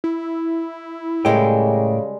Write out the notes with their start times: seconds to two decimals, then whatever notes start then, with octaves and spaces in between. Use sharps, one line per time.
0.04 E4
1.25 A2 C#3 G3 G#3 A4 A#4 G5